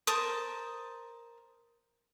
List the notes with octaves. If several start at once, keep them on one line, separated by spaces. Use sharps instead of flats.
A#4 C5 A5 D#6